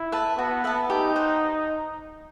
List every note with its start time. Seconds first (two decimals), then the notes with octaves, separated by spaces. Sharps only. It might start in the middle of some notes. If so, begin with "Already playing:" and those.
Already playing: E4
0.12 B4 E5 A5
0.38 B3 F#4
0.64 B4 E5 A5
0.90 D#4 G4
1.16 C5 F#5